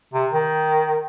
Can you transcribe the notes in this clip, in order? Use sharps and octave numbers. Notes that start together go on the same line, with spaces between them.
C3
D#3